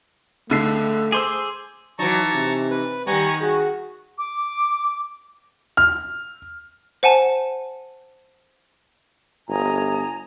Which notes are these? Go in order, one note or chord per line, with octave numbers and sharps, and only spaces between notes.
C#2 D3 A3 C7
G#4 C5 C6 D6 E6
E3 F#3 D#4 A5 A#5 C#6
C3
B4
D#3 G3 B3 G#5 A#5 C#6
F#4 G#4
D6
F6
C5 F#5 G#5 A5
G1 D#5 G#5 A#5